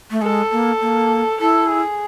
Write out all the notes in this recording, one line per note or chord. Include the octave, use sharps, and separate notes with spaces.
A3
G#3 A4
A#3
A#3
E4 A4
G#4